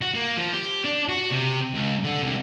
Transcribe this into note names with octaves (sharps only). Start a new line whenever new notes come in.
F#4
A#3
F3
G4
D4
F#4
C3
C#2
D3
C2